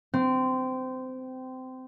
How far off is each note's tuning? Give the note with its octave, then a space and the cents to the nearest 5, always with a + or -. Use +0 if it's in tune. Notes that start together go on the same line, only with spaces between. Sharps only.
C4 -20